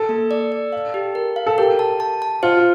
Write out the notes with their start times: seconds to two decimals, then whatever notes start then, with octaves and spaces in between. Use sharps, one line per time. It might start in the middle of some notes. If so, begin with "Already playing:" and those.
Already playing: A4
0.09 A#3
0.31 D5
0.52 D5
0.72 F5
0.94 G4
1.15 A#4
1.36 F5
1.46 A4
1.58 G4 A#4
1.79 A5
2.00 A5
2.22 A5
2.43 F4 C5